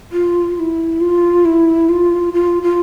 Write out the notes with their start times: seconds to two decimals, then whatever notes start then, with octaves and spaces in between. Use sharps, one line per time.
0.12 F4
0.55 F4
0.60 E4
1.01 F4
1.45 E4
1.89 F4
2.33 F4
2.62 F4